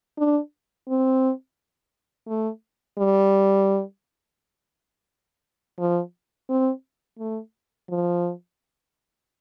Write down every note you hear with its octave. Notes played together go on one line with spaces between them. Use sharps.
D4
C4
A3
G3
F3
C4
A3
F3